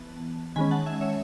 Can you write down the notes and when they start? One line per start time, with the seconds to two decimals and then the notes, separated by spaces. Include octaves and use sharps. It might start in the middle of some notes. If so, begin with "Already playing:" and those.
Already playing: E3 B3 A5
0.56 D#3 G#3 C#4 G#5 B5
0.71 F#5 A5
0.86 E5 G#5
1.01 C#5 E5